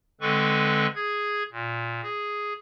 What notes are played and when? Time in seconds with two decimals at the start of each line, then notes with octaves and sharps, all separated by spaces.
0.21 D3 G#3 C4 A4 B4 C#6
0.95 G#4 G#6
1.52 A#2
2.03 G#4